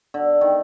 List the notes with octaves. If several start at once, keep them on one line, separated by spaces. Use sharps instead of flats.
D3
D#3